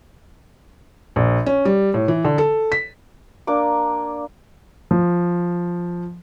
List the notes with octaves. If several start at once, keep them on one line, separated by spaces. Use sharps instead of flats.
A#1
C#4
G3
A2
E3
D3
A4
B6
A#3 D4 D6
F3